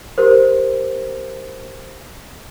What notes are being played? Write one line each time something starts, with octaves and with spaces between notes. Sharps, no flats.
G4 A#4 C5